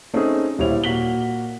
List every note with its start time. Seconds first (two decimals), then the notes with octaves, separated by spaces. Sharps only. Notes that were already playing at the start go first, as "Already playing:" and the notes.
0.14 A3 C4 C#4 D#4 G#4
0.59 D#1 G3 E4 C5 C#5 F7
0.84 A#2 A#3 F#4 B6 F#7 G7